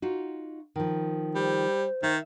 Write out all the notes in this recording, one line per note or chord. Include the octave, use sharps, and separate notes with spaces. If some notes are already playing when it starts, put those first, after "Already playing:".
D#4 F4 F#4
D#3 F3
G3 C5
D#3 E5